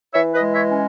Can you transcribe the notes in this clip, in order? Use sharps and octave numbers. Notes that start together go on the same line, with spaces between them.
E3 C#5 E5
B4 D#5
G#3
C#5 E5
C#4